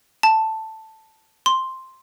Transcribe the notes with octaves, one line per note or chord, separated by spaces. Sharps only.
A5
C6